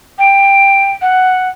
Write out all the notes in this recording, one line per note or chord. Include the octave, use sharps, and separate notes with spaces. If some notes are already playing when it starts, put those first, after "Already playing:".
G5
F#5